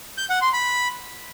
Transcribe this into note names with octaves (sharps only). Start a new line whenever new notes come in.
G6
F#5
C6
B5